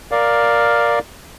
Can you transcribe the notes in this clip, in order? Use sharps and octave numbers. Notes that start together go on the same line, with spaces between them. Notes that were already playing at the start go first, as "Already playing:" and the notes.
A#4 D5 F5